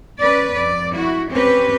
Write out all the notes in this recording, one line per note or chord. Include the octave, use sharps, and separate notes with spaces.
C#4 B4 D5
F2 D5
E4 F#4
C4 C#4 G4 B4